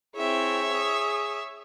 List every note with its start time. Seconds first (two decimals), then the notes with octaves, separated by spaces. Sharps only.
0.16 C4 E4 G#4 C#5 E5
0.75 D#6